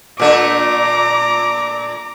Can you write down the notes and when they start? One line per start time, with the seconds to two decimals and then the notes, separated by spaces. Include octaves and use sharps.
0.20 A#2 A3 D4 A#5 D6